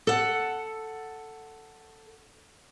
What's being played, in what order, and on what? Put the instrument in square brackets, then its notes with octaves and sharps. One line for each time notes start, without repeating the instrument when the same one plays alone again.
[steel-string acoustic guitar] A4 F#5